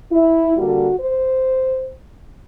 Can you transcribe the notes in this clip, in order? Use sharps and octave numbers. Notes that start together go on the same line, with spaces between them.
E4
D3 G3 A#3 F#4
C5